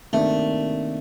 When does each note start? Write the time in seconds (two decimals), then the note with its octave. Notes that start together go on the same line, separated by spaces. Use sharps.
0.13 C3 D#3 A3 A#3 D4